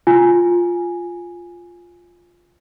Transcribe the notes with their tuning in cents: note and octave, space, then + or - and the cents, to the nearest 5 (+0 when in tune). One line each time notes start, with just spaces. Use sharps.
F4 +0 G#5 +0